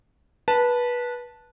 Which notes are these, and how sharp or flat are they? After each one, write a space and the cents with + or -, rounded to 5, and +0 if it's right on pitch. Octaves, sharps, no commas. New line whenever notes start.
B4 -20 A5 +0